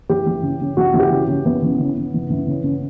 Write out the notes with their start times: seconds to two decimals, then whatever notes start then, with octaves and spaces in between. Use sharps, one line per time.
0.09 E3 G4
0.27 E3
0.43 C#3
0.61 C#3
0.77 E3 F#4
0.94 E3
1.00 G4
1.12 C#3
1.28 C#3
1.45 E3 B3
1.63 E3
1.80 C#3
1.97 C#3
2.14 E3
2.30 E3
2.48 C#3
2.64 C#3